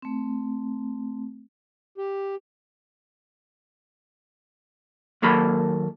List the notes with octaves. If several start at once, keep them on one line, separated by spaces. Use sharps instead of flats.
A3 C4
G4
D#2 F#3 A#3 A4 B5